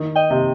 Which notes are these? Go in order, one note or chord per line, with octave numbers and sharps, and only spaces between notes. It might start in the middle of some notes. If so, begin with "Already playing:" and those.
Already playing: D#3
D#5 G5
C3